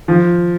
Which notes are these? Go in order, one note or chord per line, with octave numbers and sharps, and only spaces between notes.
F3